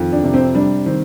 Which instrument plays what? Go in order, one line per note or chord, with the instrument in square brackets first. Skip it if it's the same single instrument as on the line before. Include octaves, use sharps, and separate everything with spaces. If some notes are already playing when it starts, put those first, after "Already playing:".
Already playing: [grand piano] F2 D#3
D4
C3
C4
G3 D4
D#3 C4